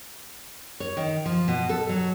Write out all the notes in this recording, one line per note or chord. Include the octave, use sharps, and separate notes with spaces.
C#5
D#3
F3
B2
A4
F#3